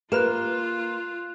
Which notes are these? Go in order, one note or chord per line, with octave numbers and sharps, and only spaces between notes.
A#3 F4 G4 B4 B5 F#6 E7